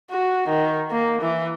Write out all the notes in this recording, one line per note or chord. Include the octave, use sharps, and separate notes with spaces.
F#4
D#3
A#3
E3